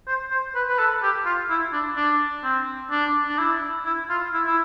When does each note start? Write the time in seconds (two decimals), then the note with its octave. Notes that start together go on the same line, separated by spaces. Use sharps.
0.07 C5
0.31 C5
0.55 B4
0.68 B4
0.79 A4
1.03 G4
1.26 F4
1.50 E4
1.73 D4
1.96 D4
2.44 C4
2.91 D4
3.28 D4
3.39 E4
3.86 E4
4.10 F4
4.33 E4
4.46 E4